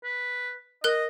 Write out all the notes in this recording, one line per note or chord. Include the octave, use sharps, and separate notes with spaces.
B4
A#4 D#5 F#6